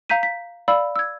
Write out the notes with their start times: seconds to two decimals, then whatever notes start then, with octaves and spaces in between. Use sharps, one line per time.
0.09 F5 A#5 G6 B6 D#7
0.23 B6
0.68 D5 F5 B5 E6
0.96 E6 G#6